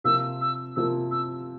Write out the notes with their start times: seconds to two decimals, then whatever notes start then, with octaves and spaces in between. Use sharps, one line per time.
0.04 C3 F3 A#3 F4 E6
0.41 E6
0.76 C3 F3 A#3 F4 E6
1.11 E6